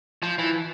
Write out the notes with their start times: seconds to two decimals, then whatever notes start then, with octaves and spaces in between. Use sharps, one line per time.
0.23 F3
0.38 E3